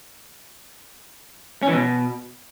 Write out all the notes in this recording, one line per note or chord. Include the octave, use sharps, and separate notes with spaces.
C#4
E3
B2